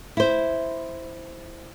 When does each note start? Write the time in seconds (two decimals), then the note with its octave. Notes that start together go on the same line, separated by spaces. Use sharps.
0.17 E4 C5